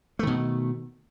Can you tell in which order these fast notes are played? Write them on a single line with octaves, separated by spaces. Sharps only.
A3 D#3 B2